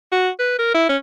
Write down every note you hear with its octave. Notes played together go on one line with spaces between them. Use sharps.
F#4
B4
A#4
E4
C#4